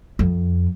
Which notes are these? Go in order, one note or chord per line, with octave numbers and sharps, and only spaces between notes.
F2